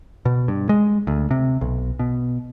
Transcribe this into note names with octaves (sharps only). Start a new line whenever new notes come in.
B2
G2
G#3
D2
C3
B1
B2